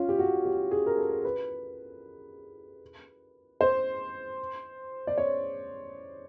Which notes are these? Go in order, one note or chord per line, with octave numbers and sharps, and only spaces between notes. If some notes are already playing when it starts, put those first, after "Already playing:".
Already playing: C#4 F4
G4
F#4
G4
G#4
A#4
A4
B4
C5
D5
C#5